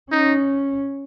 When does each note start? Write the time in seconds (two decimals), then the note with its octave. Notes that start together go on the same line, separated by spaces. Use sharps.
0.12 C#4 D#4